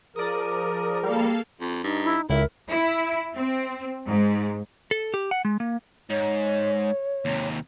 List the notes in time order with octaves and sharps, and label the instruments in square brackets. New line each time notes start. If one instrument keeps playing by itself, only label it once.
[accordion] F3 A#4 [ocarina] G#4 [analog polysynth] D5 D#6
[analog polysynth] G3 [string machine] A#3 A4 F5
[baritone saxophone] F2
[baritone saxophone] G2 [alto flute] D#4
[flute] E4
[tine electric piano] C#2 [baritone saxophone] E4 [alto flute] A#4 [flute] E5
[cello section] E4
C4
G#2
[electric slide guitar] A4
G4
F#5
G#3
A#3
[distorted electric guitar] G#2 [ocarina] C#5
[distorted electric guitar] D#2 C3